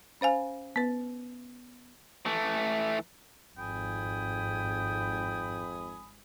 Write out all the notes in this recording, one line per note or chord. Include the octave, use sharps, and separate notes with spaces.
C#4 C5 F5 G#5
B3 B4
E3 A3
G#1 F2 G#2 G5 G#5 B5 D#6